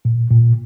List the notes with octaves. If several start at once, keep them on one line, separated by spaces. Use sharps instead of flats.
A#2
A#2